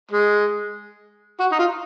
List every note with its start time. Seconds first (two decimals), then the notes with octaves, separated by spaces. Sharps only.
0.11 G#3
1.40 F#4
1.52 D#4
1.59 F4